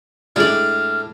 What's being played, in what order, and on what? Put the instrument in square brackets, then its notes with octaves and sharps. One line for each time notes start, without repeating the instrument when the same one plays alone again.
[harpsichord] A2 D4 [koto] G#3 D5 [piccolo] F6